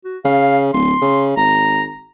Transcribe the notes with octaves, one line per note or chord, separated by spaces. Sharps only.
F#4
C#3 F5
D1 C6
C#3
G#1 A#5